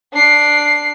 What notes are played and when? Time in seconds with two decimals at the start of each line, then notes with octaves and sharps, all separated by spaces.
0.14 D4 C7